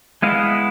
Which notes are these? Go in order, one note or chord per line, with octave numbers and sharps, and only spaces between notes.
G#3 B3 E4 D#5 F5